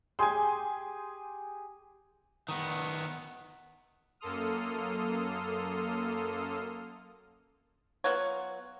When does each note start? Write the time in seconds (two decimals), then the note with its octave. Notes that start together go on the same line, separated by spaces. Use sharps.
0.19 G4 G#4 G#5 C6
2.49 D#3 B3
4.20 F#2 A#3 A4 C6 D#6 F6
8.04 F#3 B3 F4 C#5